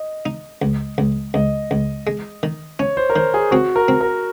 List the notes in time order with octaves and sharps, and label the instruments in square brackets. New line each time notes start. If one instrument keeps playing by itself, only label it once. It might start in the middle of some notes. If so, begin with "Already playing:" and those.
Already playing: [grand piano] D#5
[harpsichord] D#4
C#2
C#2
[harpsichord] C#2 [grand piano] D#5
[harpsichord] C#2
G#3
D#3
[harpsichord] C#4 [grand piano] C#5
[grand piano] C5
A#4
[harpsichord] D#3 [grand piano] C5
[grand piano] G#4
[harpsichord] C4 [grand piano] F#4
[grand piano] A#4
[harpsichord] C4
[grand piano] A#4